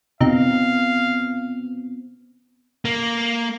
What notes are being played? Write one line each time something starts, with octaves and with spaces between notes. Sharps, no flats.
C3 B3 C4 D#4 F4 F5
A#3